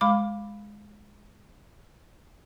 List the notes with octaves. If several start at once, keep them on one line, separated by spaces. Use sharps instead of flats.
G#3 F5 B5 D6